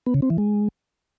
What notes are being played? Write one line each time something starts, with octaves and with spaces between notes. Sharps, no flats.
B3
C#3
C4
E3
G#3